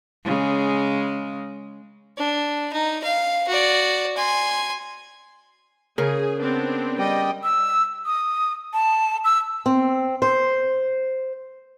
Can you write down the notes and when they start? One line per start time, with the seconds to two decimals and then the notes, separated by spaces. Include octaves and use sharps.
0.25 C#3 G#3
2.17 D4
2.73 D#4
3.03 F5
3.48 F#4 D5
4.17 G#5 C6
5.98 C#3 G#4 A#4
6.40 B3 C4 D4
6.99 G3 D#5 G5
7.43 E6
8.06 D#6
8.73 A5
9.25 E6
9.66 C4
10.22 C5